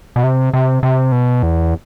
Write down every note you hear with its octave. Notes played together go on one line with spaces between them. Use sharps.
B2
C3
C3
C3
B2
E2